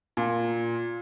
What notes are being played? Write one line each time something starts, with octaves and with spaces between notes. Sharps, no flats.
A#2